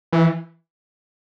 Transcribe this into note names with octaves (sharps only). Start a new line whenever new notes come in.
E3